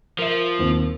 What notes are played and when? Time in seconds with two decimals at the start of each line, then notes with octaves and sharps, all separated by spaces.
0.19 F3 A#4 E5
0.59 D#1 D#2 C4